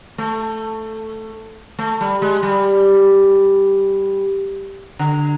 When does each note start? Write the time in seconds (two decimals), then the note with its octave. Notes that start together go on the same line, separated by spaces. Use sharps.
0.18 A3
1.79 A3
2.01 G3
2.22 G#3
2.43 G3
4.99 D3